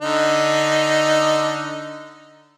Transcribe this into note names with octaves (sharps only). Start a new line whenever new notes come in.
D3 D#4